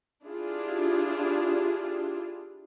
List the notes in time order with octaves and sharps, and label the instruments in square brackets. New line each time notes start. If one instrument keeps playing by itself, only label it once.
[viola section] D4 E4 F4 G4 G#4